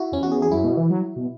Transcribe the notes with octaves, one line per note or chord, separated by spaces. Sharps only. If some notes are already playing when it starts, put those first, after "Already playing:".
Already playing: E4 F#4
E2 C#4
F#4
G#4
G#4
F#2 E4
B2
E3
F#3
B2